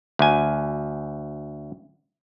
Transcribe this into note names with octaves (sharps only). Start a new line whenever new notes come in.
D2 G#5